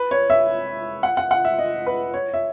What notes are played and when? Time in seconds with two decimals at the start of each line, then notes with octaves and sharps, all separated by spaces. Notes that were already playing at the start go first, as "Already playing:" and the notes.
Already playing: B4
0.11 C#5
0.30 E5
1.03 F#5
1.17 F#5
1.31 F#5
1.45 E5
1.59 D#5
1.86 B4
2.14 C#5
2.34 E5